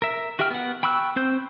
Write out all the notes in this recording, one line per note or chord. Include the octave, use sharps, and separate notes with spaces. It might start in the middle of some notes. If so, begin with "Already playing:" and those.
A#4 E5
F#4 G4 E5 G5 F6
B3 F#5
G5 B5 C#6 E6 F#6
C4 C5 G6